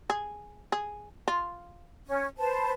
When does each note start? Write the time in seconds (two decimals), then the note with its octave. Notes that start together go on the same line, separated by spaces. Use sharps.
0.10 G#4
0.72 G#4
1.28 F4
2.05 C#4
2.38 B4 C5 A5